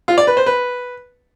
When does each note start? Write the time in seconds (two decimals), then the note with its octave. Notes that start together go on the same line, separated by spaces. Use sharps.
0.08 F4
0.18 D5
0.27 B4
0.37 C5
0.46 B4